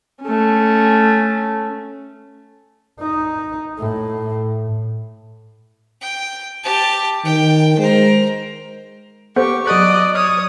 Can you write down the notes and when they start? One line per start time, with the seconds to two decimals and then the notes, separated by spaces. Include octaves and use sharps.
0.22 A3 C#4
3.00 D#4
3.78 A2
6.01 G5
6.63 G4 A5
7.25 D#3 G5
7.79 G#3 A#4 C5
9.36 B3 G4 A4 C5 C#6
9.67 F#3 D5 D#5 F#6
10.15 C#5 D#6 F6